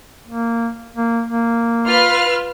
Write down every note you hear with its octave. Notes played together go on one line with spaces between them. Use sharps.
A#3
A#3
A#3
F4 B4 F6